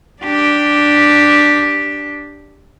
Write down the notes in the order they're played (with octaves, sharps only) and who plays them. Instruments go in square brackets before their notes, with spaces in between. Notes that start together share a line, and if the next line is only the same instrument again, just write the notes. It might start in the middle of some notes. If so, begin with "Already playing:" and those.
[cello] D4 G4